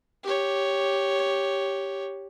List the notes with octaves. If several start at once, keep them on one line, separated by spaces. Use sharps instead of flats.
G4 C#5